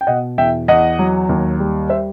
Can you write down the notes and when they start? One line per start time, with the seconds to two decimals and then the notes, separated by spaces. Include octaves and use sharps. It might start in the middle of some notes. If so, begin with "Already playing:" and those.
0.01 G5
0.07 B2 D#5 F#5
0.38 E2 E5 G5
0.68 E2 D#5 F#5
0.99 F#3
1.29 D#2
1.60 G3
1.89 C5 E5